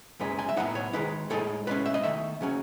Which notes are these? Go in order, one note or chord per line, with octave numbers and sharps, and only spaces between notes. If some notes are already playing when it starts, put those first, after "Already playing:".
F#2 C#3 G#3 D#4 B4
G#5
E5
A2 F#3 B3 D#4 F#5
C#5
D#3 G#3 D#4 B4
A2 G#3 D#4 A4
A2 G#3 C#4 B4
E5
D#5
D#3 A3 D#4 E5
C#3 F#3 C#4